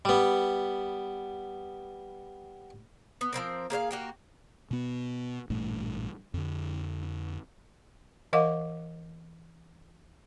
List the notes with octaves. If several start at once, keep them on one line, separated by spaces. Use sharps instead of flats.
G3 B3
B3
F3 G3 C4 A#4
A#3 G#4 C#5 F5
A#3 F#4 G4
B2 B3
A1 G2 A#2 A3
F2 D3
E3 A#4 D#5 F5 F#5 D6